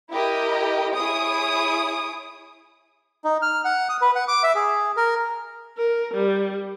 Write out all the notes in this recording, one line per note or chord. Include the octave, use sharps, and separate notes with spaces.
E4 G4 A#4 D#5
E4 G#4 C#5 D#6 D7
D#4
F6
F#5
D#6
B4
F#5
D6
E5
G#4
A#4
A#4
G3